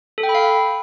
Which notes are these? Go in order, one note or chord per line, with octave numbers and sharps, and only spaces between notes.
A4
G5
B5
F5